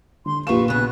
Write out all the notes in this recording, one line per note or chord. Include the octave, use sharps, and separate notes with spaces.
D3 C6
A#1 F4 G4 B4 F5 C#6 E7
C#3 B3 F#6